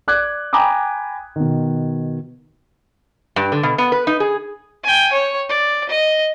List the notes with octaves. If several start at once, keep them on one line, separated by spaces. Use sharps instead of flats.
D5 D6 F#6 G#6
G5 G#5 A#5 B5 D6 D#6
B2 D#3
G2
D3
B2
B3
B4
D#4
G#4
G5 G#5
C#5
D5
D#5